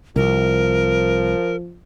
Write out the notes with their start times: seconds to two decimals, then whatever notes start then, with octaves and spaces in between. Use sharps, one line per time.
0.16 C2 F3 A#4